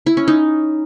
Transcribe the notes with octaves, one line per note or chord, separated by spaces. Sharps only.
E4
C#4
D#4